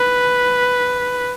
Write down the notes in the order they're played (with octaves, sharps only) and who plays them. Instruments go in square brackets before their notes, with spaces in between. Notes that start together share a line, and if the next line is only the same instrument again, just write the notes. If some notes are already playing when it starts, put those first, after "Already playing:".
Already playing: [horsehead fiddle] B4